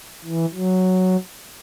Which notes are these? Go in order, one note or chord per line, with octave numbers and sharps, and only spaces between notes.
E3
F#3